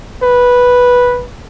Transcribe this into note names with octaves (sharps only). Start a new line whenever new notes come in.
B4